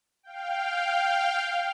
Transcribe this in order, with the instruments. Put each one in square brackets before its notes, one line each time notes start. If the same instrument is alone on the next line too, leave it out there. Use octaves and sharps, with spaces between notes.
[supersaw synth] F5 G5